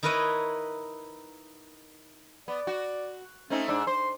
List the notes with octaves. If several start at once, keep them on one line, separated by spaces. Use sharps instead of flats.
D#4 E4 A#4 B4 C#5 D#5
B3 D5
F#4
A3 C4 C#4 D#4
G#2 D4 E6
C5 C6